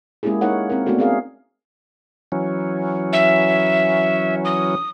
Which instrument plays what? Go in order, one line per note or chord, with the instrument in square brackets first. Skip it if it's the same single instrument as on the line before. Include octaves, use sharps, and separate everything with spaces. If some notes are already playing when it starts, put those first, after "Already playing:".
[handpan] G#3 A#3 C#4 E4 G4 G#4
A#3 D#4 A#4 C#5 F#5
C4 A#4
A3 B3 D4 F#4 A4
C4 C#4 G#4 A#4 F5
[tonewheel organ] E3 F#3 C#4
[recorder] E5
D#6